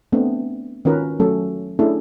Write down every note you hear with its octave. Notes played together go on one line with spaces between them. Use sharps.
A3 B3 C4 D4
D#3 C#4 F4 F#4 A#4 B4
F#3 A3 C#4 A4
A3 C#4 D4 E4 G#4 A4